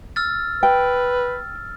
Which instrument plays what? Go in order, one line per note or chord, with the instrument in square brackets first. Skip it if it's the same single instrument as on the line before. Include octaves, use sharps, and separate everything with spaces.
[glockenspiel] E6 F6 A6
[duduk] B4 [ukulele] G5